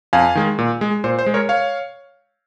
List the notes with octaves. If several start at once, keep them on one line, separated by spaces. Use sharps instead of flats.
F2 F5 G#5
D#3 G#3
A#2
G#3
A#2 C5
C5
G#3
A#4 C#5
C#5 F5